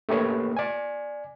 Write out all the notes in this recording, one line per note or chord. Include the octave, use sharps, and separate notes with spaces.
A3 A#3 G4 B4 C#5
D5 G#5